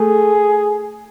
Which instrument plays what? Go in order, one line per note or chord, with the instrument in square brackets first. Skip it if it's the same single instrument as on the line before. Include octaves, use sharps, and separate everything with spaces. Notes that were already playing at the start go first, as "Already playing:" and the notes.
Already playing: [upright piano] A3 [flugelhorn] G#4